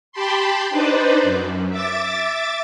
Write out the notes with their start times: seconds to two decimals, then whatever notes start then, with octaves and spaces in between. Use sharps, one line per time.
0.12 G4 G5 A5 B5 C6
0.70 D4 D#4 B4 C5 D5
1.23 F#2
1.70 E5 D6 A6